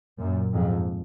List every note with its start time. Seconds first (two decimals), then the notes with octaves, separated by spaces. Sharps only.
0.20 F#2 A#2
0.54 F2 G#2